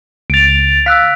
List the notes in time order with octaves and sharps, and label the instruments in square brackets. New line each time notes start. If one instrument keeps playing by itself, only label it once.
[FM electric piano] C#2 A6 [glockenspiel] D7 F7
[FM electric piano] F5 [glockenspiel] E6 F#6 B6